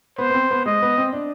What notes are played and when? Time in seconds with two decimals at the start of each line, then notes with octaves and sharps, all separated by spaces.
0.18 B3 C5
0.30 B3
0.34 C4
0.51 B3
0.66 G#3 D#5
0.82 B3
0.98 C4
1.13 D4